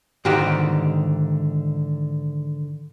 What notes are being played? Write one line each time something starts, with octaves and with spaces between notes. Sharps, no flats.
G#2 D3 D#3 F#4 G4